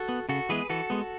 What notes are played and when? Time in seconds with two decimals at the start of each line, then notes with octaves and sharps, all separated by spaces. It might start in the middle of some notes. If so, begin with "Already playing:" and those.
Already playing: F#4 A4
0.09 B3
0.29 C#3 F#4 A4
0.49 E3 G#3 B3 G#4 B4
0.70 E3 F#4 A4
0.90 G#3 B3